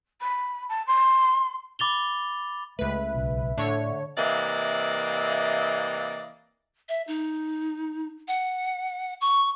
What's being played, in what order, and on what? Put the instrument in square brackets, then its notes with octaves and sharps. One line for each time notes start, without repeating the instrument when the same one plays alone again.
[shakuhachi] B5
A5
C6
[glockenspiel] B5 D6 A6 F7 G7
[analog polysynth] C#2 B4 [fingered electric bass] A3 [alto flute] E5
[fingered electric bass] B1 C#3
[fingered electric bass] A2 [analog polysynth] D3 C#5
[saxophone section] C3 E3 A#3 D5 D#5
[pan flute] E5
D#4
F#5
C#6